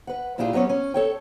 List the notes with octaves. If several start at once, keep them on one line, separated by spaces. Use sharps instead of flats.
B4 F#5
A#2 D4 E4 F4 G4 G#4
F#3 G3 B3 C#4 C#5
C#4
A4 C#5 G5